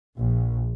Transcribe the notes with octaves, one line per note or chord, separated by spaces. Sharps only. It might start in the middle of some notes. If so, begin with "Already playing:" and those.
A#1